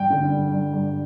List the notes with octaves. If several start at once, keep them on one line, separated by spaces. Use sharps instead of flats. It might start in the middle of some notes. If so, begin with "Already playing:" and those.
Already playing: G2 G5
D3
G2
G2
G2